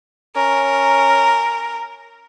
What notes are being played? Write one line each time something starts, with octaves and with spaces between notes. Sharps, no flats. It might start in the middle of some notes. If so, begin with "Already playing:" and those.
C#4 A#4